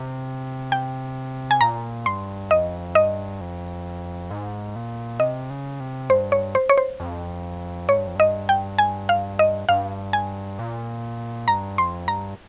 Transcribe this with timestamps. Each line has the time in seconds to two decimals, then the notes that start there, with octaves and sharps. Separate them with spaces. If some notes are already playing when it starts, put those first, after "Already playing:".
Already playing: C3
0.72 G5
1.51 G#5
1.61 A#2 A#5
2.06 G2 C6
2.51 F2 D#5
2.95 G2 D#5
3.41 F2
4.31 G#2
4.76 A#2
5.20 C3 D#5
5.50 C#3
5.80 C3
6.10 G2 C5
6.32 C#5
6.55 C5
6.69 C#5
6.77 C5
7.00 F2
7.89 G#2 C#5
7.98 G2
8.07 F2
8.16 G2 D#5
8.49 G5
8.78 G#5
9.09 F5
9.39 D#5
9.69 G2 F5
10.13 G#5
10.59 A#2
11.48 G2 A#5
11.78 F2 C6
12.08 G2 A#5